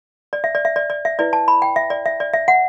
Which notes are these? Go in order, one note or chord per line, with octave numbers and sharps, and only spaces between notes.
D5
E5
D5
E5
D5
D5
E5
E4 B4 D5
A5
B5
G5
E5
D5
E5
D5
E5
F#5